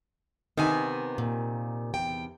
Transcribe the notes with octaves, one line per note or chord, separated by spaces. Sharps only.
C3 D#3 B3 G#5
A#2
E2 G5